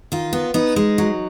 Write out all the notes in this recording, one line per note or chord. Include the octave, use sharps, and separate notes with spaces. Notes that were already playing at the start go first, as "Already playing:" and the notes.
D#3 F4
B3
B3 D#4
G#3
F#3